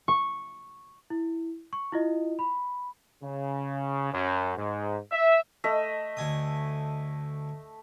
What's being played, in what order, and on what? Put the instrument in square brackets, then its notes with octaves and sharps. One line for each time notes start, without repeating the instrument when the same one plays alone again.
[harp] C#6
[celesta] E4
C#6
E4 F4 D#5
B5
[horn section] C#3
F#2
G#2
E5
[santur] A3 D#5 E5
[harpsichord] D2 G#5 D#6